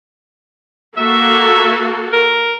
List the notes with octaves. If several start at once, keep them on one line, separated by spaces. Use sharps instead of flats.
A#3 F#4 A4 E5
A#4